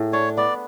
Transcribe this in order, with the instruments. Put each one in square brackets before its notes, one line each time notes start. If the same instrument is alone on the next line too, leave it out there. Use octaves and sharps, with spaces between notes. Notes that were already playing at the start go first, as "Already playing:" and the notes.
Already playing: [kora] A2 G#4
[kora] D4 [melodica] C#5
[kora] B3 [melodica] D5